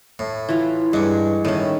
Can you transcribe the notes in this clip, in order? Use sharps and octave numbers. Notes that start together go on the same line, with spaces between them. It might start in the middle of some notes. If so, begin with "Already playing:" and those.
A2
E3 F4
G2 G#3 C#6
A2 D#3 C#4